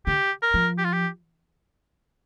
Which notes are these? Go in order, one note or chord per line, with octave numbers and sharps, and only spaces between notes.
D3 G4
A#4
F3
G4
F4
G4